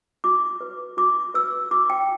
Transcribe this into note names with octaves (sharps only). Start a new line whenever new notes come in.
F#4 D6
B4
F#4 D6
B4 E6
F#4 D6
G5